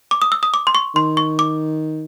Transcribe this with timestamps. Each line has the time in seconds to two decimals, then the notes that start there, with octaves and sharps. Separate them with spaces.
0.11 D6
0.22 D#6
0.32 E6
0.43 D#6
0.54 D6
0.67 C6
0.75 C#6
0.95 D#3 C6
1.17 C#6
1.39 D6